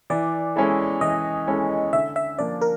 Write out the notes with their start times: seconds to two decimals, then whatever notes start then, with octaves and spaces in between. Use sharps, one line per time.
0.10 E3 D5
0.56 G#3 C#4 E4 A4
1.01 E3 D#5
1.47 G#3 C#4 E4 A4
1.93 D3 E5
2.16 E5
2.39 F3 A#3 D4 D5
2.61 A#4